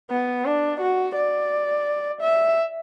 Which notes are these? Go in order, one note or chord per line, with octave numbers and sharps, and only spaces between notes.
B3
D4
F#4
D5
E5